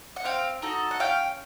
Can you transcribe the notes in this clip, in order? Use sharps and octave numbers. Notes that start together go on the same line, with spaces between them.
F#5
C4 F5 G5
D#4 F#4 A4
F#5
C#4 F5 G5